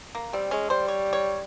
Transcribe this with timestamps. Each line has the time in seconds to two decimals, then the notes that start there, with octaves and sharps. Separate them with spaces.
0.15 A#3
0.33 G3 C4
0.51 G#3 C#4
0.70 G3 C5
0.88 C#5
1.13 C#5